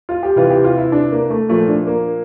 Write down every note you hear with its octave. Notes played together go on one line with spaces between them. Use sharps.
F4
G4
C3 E3 F4
G4
F4
E4
D4
A#3
A3
A#2 F3 A3
D4
A#3